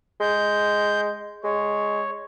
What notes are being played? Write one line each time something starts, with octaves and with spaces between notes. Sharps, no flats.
G#3 G6
G#3 C#5